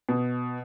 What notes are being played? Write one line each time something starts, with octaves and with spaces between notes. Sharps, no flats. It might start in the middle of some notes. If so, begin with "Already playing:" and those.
B2